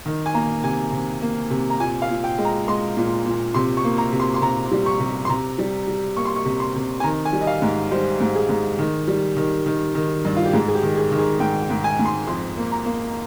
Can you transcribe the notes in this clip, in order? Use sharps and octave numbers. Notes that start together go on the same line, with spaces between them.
D#3
G#5
A#3 A#5
C3 G#5
C3
A#3
C3
A#5
A#2 G#5
F5
A#2
G5
G#3
A#5
G#3 C6
A#2
A#2
C3 C6
C#6
A#3
A#5
C3
C6
C6
C3 A#5
G3
C#6
C3
C6
C3 A#5
G3
G3
A#3 C#6
C6
C#6
C3
C6
C3
G#5
D#3 A#5
G#5
G3
D#5
F5
G#2
G3 C5
G#2
G#4
G#2
D#3
G3
D#3
D#3
D#3
G2
F4
G4
G#2 G#4
G#4
G4
D#3
G#4
D#3
G#4
G#2 G5
G5
G#2
G#5
G#2
C6
F2 C6
A#3
A#5
A#3